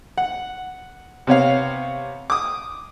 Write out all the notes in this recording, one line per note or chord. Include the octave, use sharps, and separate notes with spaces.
F#5
C3 B3 C#5 F5
D6 D#6